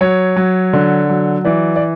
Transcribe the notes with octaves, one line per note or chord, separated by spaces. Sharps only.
F#3 C#5
F#3
D3
F#3
E3 D5
D5